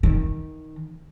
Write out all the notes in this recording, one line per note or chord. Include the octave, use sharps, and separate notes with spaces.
D#3